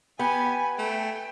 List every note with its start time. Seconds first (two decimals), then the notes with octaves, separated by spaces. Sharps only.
0.19 B3 G4 G#5
0.78 A3 G5